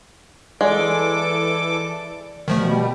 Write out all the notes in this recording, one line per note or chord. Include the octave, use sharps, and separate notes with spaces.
E3 G#3 A4 D5 D6
B2 D#3 F3 G3 A3